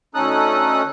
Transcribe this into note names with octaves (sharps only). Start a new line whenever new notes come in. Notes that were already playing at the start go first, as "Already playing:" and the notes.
D2 C#4 D#4 A4 D#6 F#6